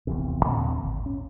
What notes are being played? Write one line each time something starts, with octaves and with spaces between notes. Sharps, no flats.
D#1 A#1 E2 C3
D#2 A#2 D3 C4
G#1
C#4